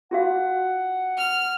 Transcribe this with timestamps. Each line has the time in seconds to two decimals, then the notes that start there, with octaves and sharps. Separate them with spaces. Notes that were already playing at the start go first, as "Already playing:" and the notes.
0.11 F4 F#4 F5 F#5
1.18 F6